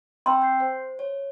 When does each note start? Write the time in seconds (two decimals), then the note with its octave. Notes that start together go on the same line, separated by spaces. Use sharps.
0.26 C4 G5 C6 E6
0.42 G6 C7
0.60 C5
0.99 C#5